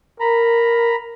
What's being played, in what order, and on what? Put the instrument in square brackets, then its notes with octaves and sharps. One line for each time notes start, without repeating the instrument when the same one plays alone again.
[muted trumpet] A#4 [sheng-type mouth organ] A#5 B5